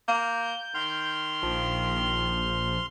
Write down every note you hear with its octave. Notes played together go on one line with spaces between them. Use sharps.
A#3 G6
D#3 C6 F6
A#1 F3